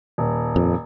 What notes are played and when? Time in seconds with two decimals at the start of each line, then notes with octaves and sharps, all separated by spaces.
0.18 D#1
0.56 F2